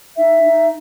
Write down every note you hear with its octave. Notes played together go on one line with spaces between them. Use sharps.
D#4 E5
D#4